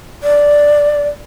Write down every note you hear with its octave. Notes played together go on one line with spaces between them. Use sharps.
D5